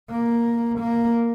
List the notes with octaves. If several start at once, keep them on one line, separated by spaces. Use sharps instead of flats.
A#3
A#3